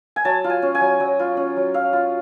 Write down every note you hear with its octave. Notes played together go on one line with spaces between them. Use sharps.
G#5
F#3 A5
F4
G#5
C#4
G#5
F#3
F#3
F4
C#4
F#3
F#3 F5
F4